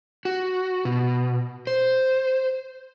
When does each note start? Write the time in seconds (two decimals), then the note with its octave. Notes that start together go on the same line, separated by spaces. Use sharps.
0.25 F#4
0.85 B2
1.67 C5